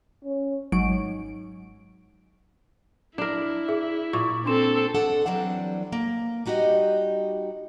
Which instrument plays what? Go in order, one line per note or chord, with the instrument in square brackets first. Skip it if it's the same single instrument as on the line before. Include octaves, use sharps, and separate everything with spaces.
[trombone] C#4
[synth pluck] G#1 F#3 D7
[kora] D4 A#4 [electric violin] E4
[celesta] G#4 E5
[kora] A#2 [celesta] C#6
[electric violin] C4 A4 [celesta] D4 C6 E7
[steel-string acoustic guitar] D4 A4 F#5
E3 F#3 G3 C4 D4
A#3
G3 D#4 F#4 G4 D#5